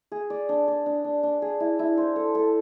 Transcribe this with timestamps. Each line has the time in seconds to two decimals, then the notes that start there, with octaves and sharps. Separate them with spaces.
0.12 G#4
0.30 D5
0.49 D4
0.68 D5
0.86 D4
1.04 D4
1.23 D4
1.42 G#4
1.60 E4
1.79 E4
1.98 C5
2.16 A4
2.35 A4